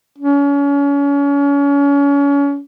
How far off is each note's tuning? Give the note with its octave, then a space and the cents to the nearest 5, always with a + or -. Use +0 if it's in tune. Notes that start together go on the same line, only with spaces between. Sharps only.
C#4 +35